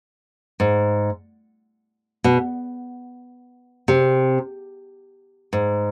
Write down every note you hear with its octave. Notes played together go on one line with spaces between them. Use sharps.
G#2
B2
C3
G#2